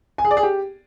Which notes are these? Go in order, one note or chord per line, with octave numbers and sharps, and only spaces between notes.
G#5
G#4
D5
G#4
G4